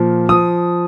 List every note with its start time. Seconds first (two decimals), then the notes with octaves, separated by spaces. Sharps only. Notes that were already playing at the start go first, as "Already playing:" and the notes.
Already playing: A#2 F3
0.29 F3 D#6